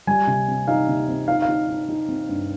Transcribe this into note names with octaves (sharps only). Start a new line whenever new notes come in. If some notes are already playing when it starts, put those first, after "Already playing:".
G3 G#5
C3
C4
D#4 F5
C3
C4
D#4 F5
F5
D#4
D#4
D#4
C4
G2